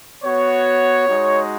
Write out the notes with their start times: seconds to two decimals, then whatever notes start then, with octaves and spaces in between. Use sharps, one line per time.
0.24 B3 F#4 C#5
1.07 G#3 D#4 F#4